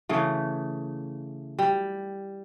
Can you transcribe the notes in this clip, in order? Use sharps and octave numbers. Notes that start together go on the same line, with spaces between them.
C#3 E3 A3
G3